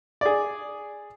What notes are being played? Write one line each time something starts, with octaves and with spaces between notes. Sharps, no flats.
G#4 D5